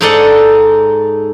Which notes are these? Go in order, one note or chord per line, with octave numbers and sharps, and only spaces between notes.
G#2 G#3 D#4 A4 D5 F#5